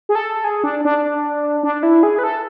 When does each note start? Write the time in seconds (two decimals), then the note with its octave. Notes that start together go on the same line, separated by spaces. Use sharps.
0.09 G#4
0.15 A4
0.44 G#4
0.64 D4
0.85 D4
1.63 D4
1.83 E4
2.03 G#4
2.19 B4
2.24 A4